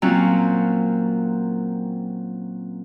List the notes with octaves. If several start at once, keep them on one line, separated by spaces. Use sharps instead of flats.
A#2 F#3 C4 C#4